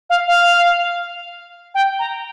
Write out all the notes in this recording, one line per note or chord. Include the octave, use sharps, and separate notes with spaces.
F5
F5
G5
A#5